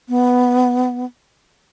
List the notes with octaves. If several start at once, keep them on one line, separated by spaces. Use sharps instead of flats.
B3